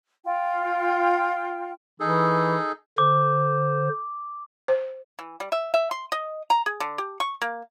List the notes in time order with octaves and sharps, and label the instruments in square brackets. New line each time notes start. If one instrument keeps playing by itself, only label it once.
[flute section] F4 G5
[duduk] E3 [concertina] D#4 G#4 A4
[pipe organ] D3 C5 [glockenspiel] D6
[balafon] C5
[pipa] E3
G3
E5
E5
C6
D#5
A#5
G#4
D3
G4
C#6
A#3